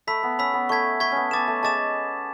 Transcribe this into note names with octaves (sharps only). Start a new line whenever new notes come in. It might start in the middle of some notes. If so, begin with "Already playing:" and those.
A3 B5 E6 B6
B3
C#4 B5 E6 B6
B3
A3 C#6 G#6 B6
A3 C#6 G#6 B6
B3 C#4
B3 A5 D6 A6 E7
A3
G#3 A5 D6 A6 E7